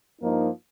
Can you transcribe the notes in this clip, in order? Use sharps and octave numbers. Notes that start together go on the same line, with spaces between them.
G2 F3 A#3 D#4